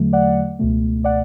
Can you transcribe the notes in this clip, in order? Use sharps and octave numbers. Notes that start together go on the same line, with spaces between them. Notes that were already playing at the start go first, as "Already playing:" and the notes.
Already playing: E2 D3 F#3 A3
D5 F#5
C#2 B2 A3
D5 F#5